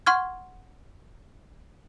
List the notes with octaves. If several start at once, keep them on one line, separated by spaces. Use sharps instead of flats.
F#5 C6 C#6 F6 G#6